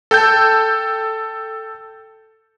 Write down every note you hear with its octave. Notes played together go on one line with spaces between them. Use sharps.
A4 G5 A5 G6